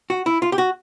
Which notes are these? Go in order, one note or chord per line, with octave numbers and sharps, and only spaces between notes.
F#4
E4
F4
G4
F#4